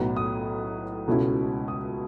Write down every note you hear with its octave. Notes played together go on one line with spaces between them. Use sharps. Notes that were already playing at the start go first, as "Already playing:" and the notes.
Already playing: B1 A2 F#3 B3 E4
D#6
C#2 B2 A3 C#4 E4
D#6